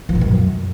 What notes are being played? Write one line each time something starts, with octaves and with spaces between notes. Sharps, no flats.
F3
B2
F#2